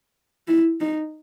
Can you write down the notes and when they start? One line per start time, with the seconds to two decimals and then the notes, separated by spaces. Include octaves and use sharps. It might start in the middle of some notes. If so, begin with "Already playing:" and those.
0.48 E4
0.80 D#4